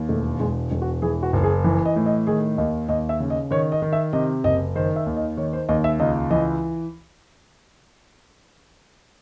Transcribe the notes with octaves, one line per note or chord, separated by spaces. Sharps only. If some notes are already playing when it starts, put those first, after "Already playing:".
Already playing: D#2
E1 A3
E1 G#3
E1
F#4
E3 G#4
F#4
F#1
G#4
E3
D#5
A2
D#5
D#3 G#4
D#2 D#5
D#2 D#5
E5
C#3
D#5
D#3 C#5
D#5
D#3
E5
C3 D#5
F#1 D#5
D#3 C5
E5
D#2
D#5
D#3 C#5
C5
D#2 D#5
E5
C#2 D#5
E3 D#5